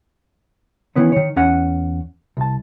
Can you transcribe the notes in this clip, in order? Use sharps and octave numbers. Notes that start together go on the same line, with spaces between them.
D#3 E3 B3 C#4
D#3 C#5
E2 C#4 F#5
C2 A5